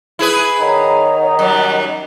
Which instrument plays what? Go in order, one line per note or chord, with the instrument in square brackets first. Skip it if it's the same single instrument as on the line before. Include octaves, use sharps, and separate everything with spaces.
[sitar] E4 G#4 B4
[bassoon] D#3 [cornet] D#4 [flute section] C#5 F#5 A#5
[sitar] F#2 G3